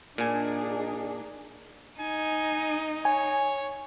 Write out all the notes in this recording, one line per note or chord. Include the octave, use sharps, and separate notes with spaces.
A#2 D4 D#4 G#4 G#5
D#4 G#5
C#5 G#5